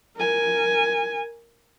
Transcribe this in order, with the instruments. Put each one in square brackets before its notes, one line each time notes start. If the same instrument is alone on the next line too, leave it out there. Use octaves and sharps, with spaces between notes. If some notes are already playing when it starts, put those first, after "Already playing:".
[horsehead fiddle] A#4 G#5